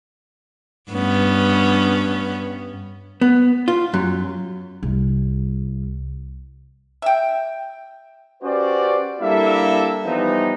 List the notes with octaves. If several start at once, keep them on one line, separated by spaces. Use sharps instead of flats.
G2 B3 C#4
B3
F4
F#2
C2
E5 G5
C#4 F#4 G4 B4 C5 D5
G3 A#3 D4 E4 A4 E5
E3 F3 G3 B3 D#4